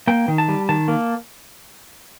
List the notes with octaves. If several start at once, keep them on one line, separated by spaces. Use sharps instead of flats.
A#3 G5
D#3
A5
G3
D#3 A5
A#3